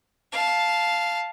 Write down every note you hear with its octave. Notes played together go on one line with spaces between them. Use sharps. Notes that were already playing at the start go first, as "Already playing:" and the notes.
F5 A5